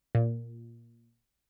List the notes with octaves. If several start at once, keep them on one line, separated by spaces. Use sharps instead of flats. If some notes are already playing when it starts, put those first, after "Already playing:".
A#2